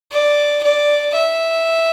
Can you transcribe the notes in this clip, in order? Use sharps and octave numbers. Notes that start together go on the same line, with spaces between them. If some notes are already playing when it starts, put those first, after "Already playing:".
D5
D5
E5